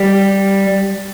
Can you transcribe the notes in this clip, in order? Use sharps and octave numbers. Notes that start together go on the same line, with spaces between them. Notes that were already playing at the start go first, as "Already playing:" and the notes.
Already playing: G3 G4